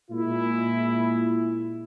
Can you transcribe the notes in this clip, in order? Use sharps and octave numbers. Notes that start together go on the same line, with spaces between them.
A#2 G#3 E4